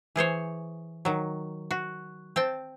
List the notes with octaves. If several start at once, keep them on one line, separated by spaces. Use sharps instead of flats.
E3 G#4 C5 C#5
D#3 F#3
F#4
C4 G5 A5